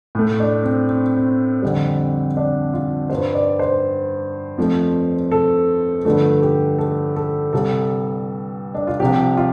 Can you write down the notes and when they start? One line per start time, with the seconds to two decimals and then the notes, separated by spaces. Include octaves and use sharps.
0.15 A2 A3
0.40 D4
0.64 C4
0.89 C4
1.16 C4
1.62 F2 D3 G3
2.37 D4
2.73 F4
3.10 G2 G3 C5
3.35 D5
3.59 C5
4.58 F2 F3 A3
5.32 A4
6.05 G2 D3 F3 A3 A4
6.42 G4
6.78 A4
7.16 A4
7.53 C2 C3 G3 A4
8.74 D4
8.87 F4
9.00 C2 C3 F3 G4
9.37 F4